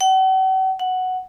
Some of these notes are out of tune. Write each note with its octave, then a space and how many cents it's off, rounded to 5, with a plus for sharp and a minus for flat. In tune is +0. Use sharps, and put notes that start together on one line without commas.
F#5 +45
F#5 +0